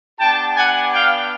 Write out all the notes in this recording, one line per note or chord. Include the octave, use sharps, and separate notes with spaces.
B3 D4 G4 G5 A5
F#5 G#5
F5 G5